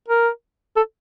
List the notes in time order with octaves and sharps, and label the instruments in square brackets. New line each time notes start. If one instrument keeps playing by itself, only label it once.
[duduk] A#4
A4